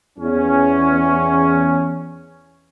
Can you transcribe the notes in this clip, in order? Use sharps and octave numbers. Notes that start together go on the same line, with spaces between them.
E2 C#4